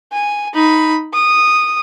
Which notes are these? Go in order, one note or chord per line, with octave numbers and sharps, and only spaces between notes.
G#5
D#4 B5
D#6